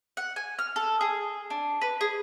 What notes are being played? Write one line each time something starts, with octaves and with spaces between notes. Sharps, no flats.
F#5
G#5
F6
A4
G#4
D4
B4
G#4